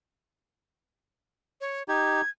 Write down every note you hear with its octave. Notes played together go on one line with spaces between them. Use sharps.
C#5
D#4 G4 G#6